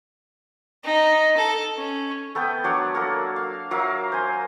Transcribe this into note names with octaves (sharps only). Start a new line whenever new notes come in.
D#4
A4
C#4
A3 B3 B4 G5
F#3 D4 C#5 F#5
A#3 F#4 A4
F5
F#3 A#4 E5 F5
C5 G#5